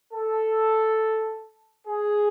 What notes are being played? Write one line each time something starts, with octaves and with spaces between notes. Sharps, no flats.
A4
G#4